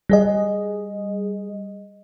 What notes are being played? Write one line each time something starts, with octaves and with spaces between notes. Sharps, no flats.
G3 G#4 D#5